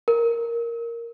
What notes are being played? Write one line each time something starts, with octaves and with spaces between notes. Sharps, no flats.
A#4